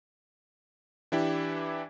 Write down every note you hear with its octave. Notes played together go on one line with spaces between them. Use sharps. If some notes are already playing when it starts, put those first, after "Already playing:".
E3 D4 E4 G4